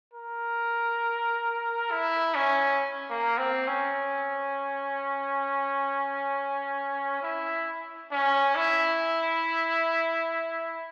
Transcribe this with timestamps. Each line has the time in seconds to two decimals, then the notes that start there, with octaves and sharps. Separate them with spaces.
0.14 A#4
1.91 E4
2.35 C#4
3.10 A#3
3.38 C4
3.68 C#4
7.23 E4
8.12 C#4
8.56 E4